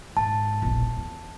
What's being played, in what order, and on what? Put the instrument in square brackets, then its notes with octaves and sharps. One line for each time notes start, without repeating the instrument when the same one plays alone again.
[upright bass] G#2 [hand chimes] A5
[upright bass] E1 A#1
E2